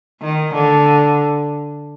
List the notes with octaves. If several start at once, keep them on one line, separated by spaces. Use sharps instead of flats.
D#3
D3